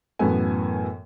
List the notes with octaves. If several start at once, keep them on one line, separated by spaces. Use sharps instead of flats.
F#2 A2 E3 B3 A4 G#5